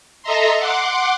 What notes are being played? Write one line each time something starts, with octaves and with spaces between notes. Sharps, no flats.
A4 D#5 E5 A#5 C6
F#5 C6 D6